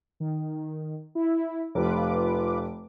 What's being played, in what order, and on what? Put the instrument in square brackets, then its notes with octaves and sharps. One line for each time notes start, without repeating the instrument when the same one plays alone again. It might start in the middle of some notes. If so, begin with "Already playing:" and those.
[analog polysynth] D#3
E4
[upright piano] F1 [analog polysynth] F4 B4 D6